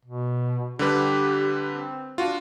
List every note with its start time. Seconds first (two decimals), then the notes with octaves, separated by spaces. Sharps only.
0.06 B2
0.79 D3 G3 G4 B4
1.69 C4
2.18 D4 F4 F#4